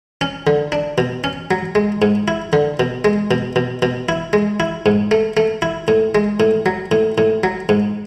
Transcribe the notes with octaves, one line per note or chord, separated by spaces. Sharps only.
C#4
D3
D4
B2
C#4
F#3
G#3
G#2
E4
D3
B2
G#3
B2
B2
B2
E4
G#3
E4
G#2
A3
A3
E4
A2
G#3
A2
F#3
A2
A2
F#3
G#2